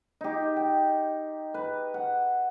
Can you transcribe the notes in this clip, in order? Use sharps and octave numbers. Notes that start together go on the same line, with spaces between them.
D#4 G4
G5
B4
F#5